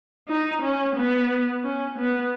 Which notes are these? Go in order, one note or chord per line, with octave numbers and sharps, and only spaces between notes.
D#4
C#4
B3
C#4
B3